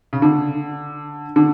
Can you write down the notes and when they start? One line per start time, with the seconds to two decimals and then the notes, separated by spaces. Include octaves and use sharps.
0.13 C#3
0.22 D3
1.36 D3